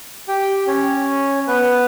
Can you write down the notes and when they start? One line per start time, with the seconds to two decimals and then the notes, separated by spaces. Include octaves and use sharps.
0.28 G4 G5
0.67 C#4 C#5
1.47 B3 B4